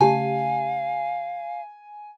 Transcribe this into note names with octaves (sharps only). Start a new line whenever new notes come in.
C#3 A3 G4 F5 G#5 A5